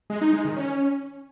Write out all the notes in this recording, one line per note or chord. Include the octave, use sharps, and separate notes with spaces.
G#3
D#4
G#3
D#3
C#4